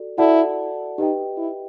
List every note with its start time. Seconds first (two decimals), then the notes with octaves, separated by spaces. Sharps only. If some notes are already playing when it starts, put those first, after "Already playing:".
Already playing: F#4 A4 D5
0.18 E4 F#4 A4 D5 F#5 A5
0.98 D#4 G4 B4 D#5 G5
1.37 E4